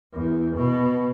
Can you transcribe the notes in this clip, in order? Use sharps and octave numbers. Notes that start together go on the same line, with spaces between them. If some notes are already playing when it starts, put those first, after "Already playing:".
E2
B2